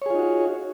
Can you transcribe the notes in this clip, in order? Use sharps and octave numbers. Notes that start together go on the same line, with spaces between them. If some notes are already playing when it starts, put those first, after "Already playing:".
D#4 F4 F#4 G#4 C#5